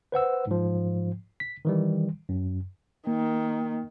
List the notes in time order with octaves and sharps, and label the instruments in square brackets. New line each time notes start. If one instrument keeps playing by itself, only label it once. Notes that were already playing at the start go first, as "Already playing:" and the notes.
[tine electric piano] B4 C5 F#5 E6
G#2 F3
B6
D#3 E3 G3
F#2
[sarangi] D#3 [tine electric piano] A#3